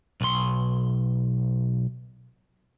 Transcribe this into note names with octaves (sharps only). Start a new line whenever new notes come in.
B1 C6